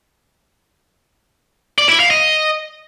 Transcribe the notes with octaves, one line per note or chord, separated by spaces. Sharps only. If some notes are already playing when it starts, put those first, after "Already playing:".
D5
E4
F5
D#5